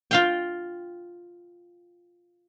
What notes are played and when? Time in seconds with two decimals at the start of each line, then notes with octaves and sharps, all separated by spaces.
0.11 F4 F5 G5